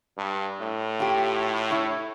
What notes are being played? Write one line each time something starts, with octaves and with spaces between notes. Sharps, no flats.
G2
A2
F4 G4
E4 C#5